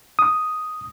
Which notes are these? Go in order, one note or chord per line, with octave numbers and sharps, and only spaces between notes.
D#6